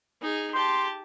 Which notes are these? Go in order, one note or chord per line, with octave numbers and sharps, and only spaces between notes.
D#4 G#4
G4 A5 C6